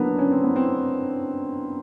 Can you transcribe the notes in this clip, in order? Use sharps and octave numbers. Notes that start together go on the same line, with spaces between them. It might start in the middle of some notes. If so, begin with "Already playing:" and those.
Already playing: F#3 A#3 B3 D4
C#4
C4
B3
C4